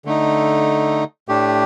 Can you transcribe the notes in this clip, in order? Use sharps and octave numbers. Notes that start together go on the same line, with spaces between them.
D3 A3 D#4
A2 A3 D4 G4